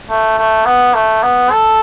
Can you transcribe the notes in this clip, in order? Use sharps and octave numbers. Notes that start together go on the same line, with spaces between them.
A3
A3
B3
A3
B3
A4